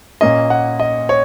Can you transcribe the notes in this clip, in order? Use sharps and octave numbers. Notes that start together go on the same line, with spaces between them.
A#2 A#3 C#4 D#5
F#5
D#5
C#5